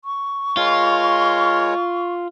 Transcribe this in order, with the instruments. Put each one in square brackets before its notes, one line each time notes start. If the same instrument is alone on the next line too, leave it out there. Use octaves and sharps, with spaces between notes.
[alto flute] C#6
[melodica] G#3 A#4 C#5 [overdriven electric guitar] F4